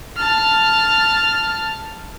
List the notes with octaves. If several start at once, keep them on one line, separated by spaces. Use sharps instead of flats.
A5 F6